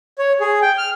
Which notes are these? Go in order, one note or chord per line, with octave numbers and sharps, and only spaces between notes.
C#5
G#4
G5
F6